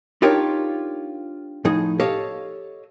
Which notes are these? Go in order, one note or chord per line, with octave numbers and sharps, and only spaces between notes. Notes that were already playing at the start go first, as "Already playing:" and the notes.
D4 D#4 F4 G4 A#4 C#5
A2 F3 D#4 G#4
G4 A4 C#5 D#5 F5